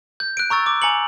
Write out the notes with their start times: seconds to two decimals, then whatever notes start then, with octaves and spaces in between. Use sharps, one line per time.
0.20 G6
0.37 F#6 D7
0.50 A#5 C#6 E6 A6
0.66 D6
0.82 G#5 A#5 C#7 F#7